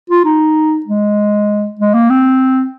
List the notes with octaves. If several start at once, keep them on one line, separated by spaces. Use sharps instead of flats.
F4
D#4
G#3
G#3
A#3
C4